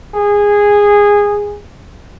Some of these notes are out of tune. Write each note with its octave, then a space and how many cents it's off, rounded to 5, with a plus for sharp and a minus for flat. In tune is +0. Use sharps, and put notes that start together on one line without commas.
G#4 -15